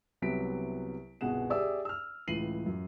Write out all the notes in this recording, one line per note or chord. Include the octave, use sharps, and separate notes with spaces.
C2 C3 F#3 B3 B6 D7
G1 C2 B2 G#4 F#5 E7
G4 G#4 D5 E5 D#6 E6
E6 F6
C#2 A2 E3 C7 D#7 F#7
F#2